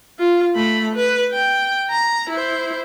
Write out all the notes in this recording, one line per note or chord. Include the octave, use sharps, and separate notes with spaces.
F4
A3 B5
B4
G5
A#5
E4 C5